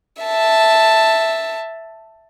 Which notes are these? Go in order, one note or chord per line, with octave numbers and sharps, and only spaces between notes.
E5 A5